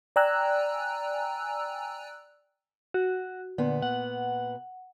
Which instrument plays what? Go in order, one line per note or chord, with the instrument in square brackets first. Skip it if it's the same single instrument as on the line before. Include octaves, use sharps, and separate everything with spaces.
[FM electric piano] D5 G5 G#5 A#5 E6 F#6
[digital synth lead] F#4
[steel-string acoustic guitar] A#2 B3 [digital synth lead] D3
[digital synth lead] F#5